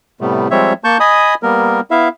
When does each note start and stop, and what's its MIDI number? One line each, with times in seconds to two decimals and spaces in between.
0.21 0.48 45
0.21 0.48 48
0.21 0.48 55
0.21 0.48 57
0.21 0.48 59
0.51 0.73 53
0.51 0.73 55
0.51 0.73 56
0.51 0.73 60
0.51 0.73 73
0.51 0.73 76
0.84 0.98 58
0.84 0.98 81
0.84 0.98 85
0.84 0.98 91
1.00 1.34 75
1.00 1.34 80
1.00 1.34 83
1.00 1.34 87
1.43 1.80 55
1.43 1.80 58
1.43 1.80 59
1.43 1.80 70
1.91 2.08 59
1.91 2.08 64
1.91 2.08 76
1.91 2.08 77